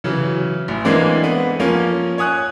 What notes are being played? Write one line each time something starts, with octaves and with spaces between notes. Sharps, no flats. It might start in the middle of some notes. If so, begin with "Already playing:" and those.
C#3 E3 F#3
A1
E3 G#3 A#3 C4 D4
B3
F3 A#3 C#4
C#5 G#5 D#6 F#6